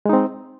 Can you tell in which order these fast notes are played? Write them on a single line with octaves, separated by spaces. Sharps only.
G#3 D#4 C4